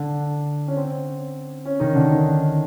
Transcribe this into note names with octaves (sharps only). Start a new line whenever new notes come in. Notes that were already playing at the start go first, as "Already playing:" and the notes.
Already playing: D3 D4
C#4
C4
C#4
D#3 D#4
D3 D4
D#3 D#4